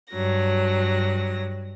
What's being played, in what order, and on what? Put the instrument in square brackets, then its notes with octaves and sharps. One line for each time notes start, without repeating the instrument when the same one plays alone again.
[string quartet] G2 F#3 A#6